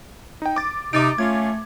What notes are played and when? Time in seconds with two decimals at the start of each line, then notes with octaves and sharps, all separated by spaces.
0.42 D#4 G5
0.56 D6 A6
0.93 C3 D#4 D6 A6 D7
1.18 A3 C#4 F4 G#6